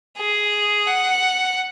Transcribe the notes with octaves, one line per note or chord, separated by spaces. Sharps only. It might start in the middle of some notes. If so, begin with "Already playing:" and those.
G#4
F#5